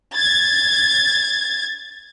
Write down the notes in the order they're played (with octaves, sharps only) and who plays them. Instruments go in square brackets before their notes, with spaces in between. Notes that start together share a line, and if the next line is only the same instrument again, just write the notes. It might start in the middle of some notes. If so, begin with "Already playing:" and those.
[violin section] G#6 A6